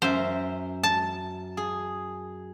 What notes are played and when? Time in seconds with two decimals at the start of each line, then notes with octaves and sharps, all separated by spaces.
0.02 F#2 C5 E5
0.83 A5
1.57 G#4